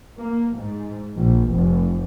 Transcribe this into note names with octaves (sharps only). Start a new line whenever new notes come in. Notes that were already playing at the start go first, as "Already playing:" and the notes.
A#3
G#2
A#1
F1